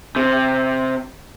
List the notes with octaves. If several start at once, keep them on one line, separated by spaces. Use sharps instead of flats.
C3